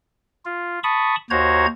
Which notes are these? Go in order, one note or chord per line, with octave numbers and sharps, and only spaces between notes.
F4
A5 B5 C#6 D#6
D#2 F#4 C5 C#5 A#5 G#6